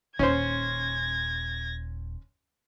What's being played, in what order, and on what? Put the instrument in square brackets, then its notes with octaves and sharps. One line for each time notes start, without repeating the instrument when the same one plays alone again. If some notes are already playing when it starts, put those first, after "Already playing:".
[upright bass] D#1 [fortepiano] C#4 C5 [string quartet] G#6 A#6